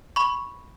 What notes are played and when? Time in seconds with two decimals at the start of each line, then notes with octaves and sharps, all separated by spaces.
0.16 B5 C#6